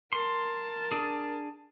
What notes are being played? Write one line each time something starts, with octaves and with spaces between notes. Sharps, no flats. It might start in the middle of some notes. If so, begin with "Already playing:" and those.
A#4 A5 C6
D4 G#4